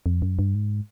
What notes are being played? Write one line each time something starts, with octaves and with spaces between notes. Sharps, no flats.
F2
F#2
G2
G#2